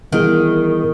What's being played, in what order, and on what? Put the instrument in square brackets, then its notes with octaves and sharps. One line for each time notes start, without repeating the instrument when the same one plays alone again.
[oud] D#3 [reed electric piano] E3 G3 B3 E4 G#4